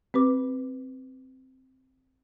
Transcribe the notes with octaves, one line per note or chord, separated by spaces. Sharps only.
C4 G4 B4 D6